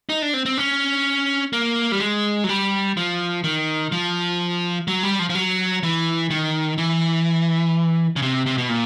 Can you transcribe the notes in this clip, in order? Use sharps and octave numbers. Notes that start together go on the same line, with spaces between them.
D#4
D4
C4
C4
C#4
A#3
G3
G#3
F#3
G3
F3
D#3
F3
F#3
G3
F3
F3
F#3
E3
D#3
E3
C#3
C3
C3
B2
A#2